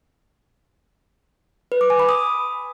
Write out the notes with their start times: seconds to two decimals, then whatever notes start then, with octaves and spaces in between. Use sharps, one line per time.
1.72 B4
1.81 D6
1.90 G#5
1.99 B5
2.09 D#6